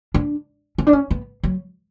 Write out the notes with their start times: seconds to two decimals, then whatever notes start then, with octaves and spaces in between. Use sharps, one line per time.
0.14 D4
0.78 C#4
0.87 D4
0.93 C#4
1.11 B3
1.43 F#3